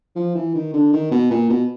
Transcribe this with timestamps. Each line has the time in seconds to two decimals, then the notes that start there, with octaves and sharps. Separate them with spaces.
0.16 F3
0.35 E3
0.55 D#3
0.73 D3
0.93 D#3
1.11 B2
1.31 A#2
1.49 B2